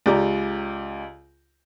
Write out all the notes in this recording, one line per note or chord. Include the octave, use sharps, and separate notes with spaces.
C#2 G4 D5 A#5